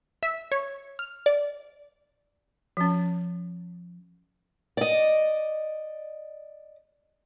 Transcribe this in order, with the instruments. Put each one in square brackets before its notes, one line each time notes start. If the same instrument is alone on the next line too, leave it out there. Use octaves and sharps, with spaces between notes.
[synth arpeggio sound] E5
C#5
F6
D5
[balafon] F3 C#4
[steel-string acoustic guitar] D5 D#5